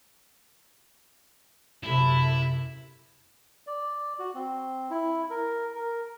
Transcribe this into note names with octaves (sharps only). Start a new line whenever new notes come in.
F#2 C3 E4 A4 B5
D5
F#4
C4
E4
A#4
A#4